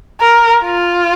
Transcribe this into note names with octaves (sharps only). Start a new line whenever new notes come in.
A#4
F4